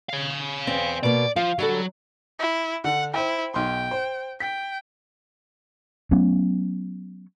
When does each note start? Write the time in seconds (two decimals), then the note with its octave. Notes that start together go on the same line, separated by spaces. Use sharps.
0.10 C#5 F5
0.67 E2 C4
1.03 B2 A#3 D5
1.36 F3 F5
1.59 D3 F#3 G3 A4
2.40 E4
2.84 D3 F#5
3.14 E4 C5 G5
3.54 B1 G5 C6
3.91 C5
4.40 G5 B6
6.11 F#3 A3 B3 C#4